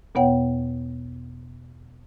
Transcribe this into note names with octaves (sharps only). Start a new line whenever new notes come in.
E2 B2 B3 C#5 F#5 G5